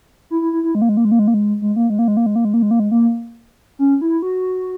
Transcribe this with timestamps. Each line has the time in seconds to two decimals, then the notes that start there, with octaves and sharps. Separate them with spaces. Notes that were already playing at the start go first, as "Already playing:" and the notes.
0.31 E4
0.42 E4
0.53 E4
0.64 E4
0.75 G#3
0.82 A#3
0.89 G#3
0.97 A#3
1.05 G#3
1.12 A#3
1.19 G#3
1.28 A#3
1.34 G#3
1.62 G#3
1.76 A#3
1.90 G#3
1.99 A#3
2.08 G#3
2.17 A#3
2.26 G#3
2.36 A#3
2.45 G#3
2.54 A#3
2.62 G#3
2.71 A#3
2.80 G#3
2.91 A#3
3.79 C#4
4.01 E4
4.22 F#4